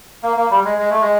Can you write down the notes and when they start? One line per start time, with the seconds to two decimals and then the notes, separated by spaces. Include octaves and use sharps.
0.23 A#3
0.37 A#3
0.50 G3
0.65 G#3
0.78 G#3
0.90 A3
1.01 G#3